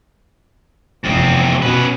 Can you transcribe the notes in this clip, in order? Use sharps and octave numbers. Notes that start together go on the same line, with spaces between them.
F1 E2 C4
B2 C#4 B4